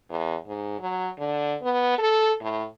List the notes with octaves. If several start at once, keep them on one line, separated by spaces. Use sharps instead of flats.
E2
G#2
F#3
D3
B3
A4
A2